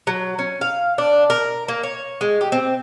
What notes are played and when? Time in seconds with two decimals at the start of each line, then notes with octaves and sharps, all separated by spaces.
0.07 F#3
0.39 C#4
0.61 F5
0.98 D4
1.30 A#4
1.68 A#3
1.83 C#5
2.21 G#3
2.41 G4
2.52 C4